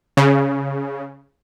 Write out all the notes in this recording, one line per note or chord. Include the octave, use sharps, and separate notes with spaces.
C#3